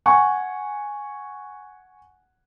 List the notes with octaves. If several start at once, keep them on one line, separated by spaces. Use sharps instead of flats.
F#5 G#5 C#6